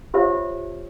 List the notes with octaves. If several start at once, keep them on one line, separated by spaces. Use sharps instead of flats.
F4 G4 C5 C#5 E5